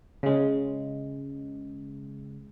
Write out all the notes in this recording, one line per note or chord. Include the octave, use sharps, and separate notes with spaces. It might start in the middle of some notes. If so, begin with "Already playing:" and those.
C#3 G#3